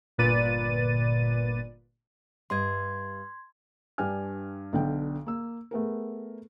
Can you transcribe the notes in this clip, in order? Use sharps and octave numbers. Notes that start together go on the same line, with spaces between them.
G1 A#2 B4 D5 A6 D#7
G2 D#5 C6 G#6
G2 D4 G5 G#5 F6
B1 D3 G5
A#3 E6
A3 B3 G#4 A#4